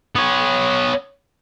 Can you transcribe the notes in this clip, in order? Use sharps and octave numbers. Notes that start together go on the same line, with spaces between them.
B3 C#5